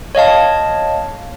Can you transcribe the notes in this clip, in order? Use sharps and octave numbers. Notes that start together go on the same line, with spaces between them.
C#5 D#5 F5 A5